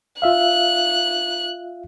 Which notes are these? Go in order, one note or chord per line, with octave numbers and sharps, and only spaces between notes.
F4 E5 F5 F#6